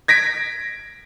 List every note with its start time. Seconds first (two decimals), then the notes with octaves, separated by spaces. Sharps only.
0.08 G#6 A#6 B6 D7